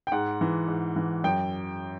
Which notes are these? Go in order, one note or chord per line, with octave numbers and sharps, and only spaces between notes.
G5
G#2 F#5
E3
G#2
E3
F#2 G5